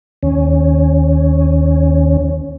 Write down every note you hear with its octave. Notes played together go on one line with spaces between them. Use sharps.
D#2 C#4